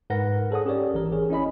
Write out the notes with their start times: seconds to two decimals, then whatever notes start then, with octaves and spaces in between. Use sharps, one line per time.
0.10 G#2 A#4 B4 F#5 A#6
0.51 G#4 A4 C#5 F#5 D#6
0.65 C#4 G4 A#4 C#5 D5
0.94 G#1 E3 A#4
1.12 C#4 G#4 C#5
1.30 C#4 E4 D#5 B5